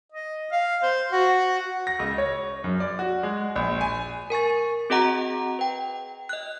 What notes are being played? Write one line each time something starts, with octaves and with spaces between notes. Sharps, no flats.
D#5
F5
C5
F#4
A#6
C#2
C#5
F#2
D5
F#4
G#3
A#1
G#5
A#4 G#5 C#6 A6
C4 F#4 G#4 D#5 F#5 A#5
B4 G5
D#5 F#6